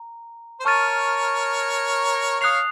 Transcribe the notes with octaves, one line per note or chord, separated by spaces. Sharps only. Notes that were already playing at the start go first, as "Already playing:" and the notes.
Already playing: A#5
C5
A#4 C#5 A5 C#6 F6 A6 D#7
C#5 F5 D#6 F#6 C7 F7